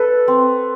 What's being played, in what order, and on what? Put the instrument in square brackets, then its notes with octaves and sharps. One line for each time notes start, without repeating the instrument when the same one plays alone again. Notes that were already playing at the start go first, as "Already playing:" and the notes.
Already playing: [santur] A4 [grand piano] B4
[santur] C4